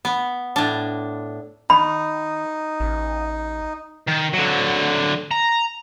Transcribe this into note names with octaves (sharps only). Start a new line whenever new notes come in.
B3
A2 D4
D#3 D#4 B5
A1
D#3
D3 F#3
A#5